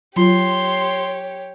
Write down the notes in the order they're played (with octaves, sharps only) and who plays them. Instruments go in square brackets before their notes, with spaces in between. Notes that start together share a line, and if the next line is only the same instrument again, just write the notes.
[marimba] F#3 F4 [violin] G4 C#5 [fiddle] C6